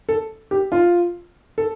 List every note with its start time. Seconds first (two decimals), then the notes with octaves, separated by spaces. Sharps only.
0.09 A4
0.51 G4
0.72 F4
1.58 A4